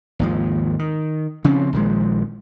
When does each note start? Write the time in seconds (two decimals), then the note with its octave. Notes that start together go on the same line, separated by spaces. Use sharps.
0.19 G#1 D#2 F3
0.79 D#3
1.44 C#3 F3 C4 C#4
1.73 A#1 D#3 F3 G#3